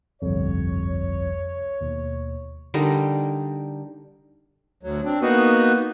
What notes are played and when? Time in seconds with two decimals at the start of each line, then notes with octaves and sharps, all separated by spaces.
0.22 G1 C2 F2 C#5
1.81 D#2 B2
2.74 D3 G3 D#4 A#4
4.83 D2 F#3
5.05 C4 D4
5.22 A#3 B3 D#4 F#4 B4